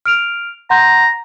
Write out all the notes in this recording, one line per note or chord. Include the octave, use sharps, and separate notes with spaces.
F6 D7 F7
F#5 A#5 C6 G6